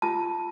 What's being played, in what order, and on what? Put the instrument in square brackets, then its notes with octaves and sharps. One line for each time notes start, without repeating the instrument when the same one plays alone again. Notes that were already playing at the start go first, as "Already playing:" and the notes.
[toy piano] F4 A5